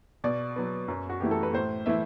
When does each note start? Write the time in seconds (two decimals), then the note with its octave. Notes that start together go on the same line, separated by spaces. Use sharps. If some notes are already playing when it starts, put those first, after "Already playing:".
0.24 B2 D5
0.56 F#3 B3
0.88 F#2
1.09 F#4
1.20 E3 A3 E4 G4
1.31 A4
1.43 B4
1.53 A2 C5
1.86 E3 A3 E4 E5